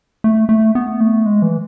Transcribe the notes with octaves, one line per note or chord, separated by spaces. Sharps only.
A3
A3
B3
A3
G#3
E3